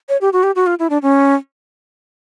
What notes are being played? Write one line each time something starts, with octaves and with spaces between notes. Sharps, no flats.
C#5
G4
F#4
G4
F#4
F4
E4
D4
C#4